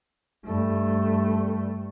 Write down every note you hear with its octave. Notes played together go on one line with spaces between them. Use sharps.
G2 A3